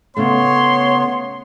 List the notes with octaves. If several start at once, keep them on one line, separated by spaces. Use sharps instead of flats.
C#3 A3 B3 C#5 C6